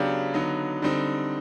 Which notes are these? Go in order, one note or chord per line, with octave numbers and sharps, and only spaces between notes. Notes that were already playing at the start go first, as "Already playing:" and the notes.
Already playing: C#3 F#3 B3 D4 G4
D3 F#3 B3 D#4
D3 G3 C4 D#4